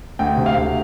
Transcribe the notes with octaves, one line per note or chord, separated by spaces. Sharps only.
D2 G5
C3
F5
D2